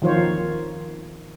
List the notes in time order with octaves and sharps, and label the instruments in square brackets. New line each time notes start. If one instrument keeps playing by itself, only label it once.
[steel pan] D#3 F3 F4 C5 C#5